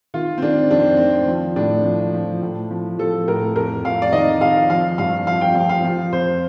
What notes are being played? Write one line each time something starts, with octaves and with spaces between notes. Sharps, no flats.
D#3 F4
C4
D#3 D4
F2 D4
C4
D#3 C4
F3
A2 D4
F3
F3
A2
F3
F3 A4
A2 A#4
F2 A#4
F2 F5
D5
D#3 D#5
F2 F5
F3 F5
G2 F5
F3 F5
G5
F3 F5
F5
F3
F2 C5